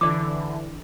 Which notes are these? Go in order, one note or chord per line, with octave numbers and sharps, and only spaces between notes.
D3 E3 D5 D6